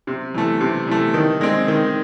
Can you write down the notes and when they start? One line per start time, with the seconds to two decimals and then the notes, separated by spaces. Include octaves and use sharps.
0.07 C3
0.34 E3 A3
0.61 C3
0.87 E3 A3
1.14 D#3
1.41 G#3 C4
1.68 D#3